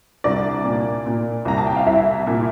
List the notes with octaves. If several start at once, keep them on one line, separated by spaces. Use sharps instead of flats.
C2 D4 D5
A#2
A#2
C2 A#5
A5
G5
F5
C2 E4 E5
A#2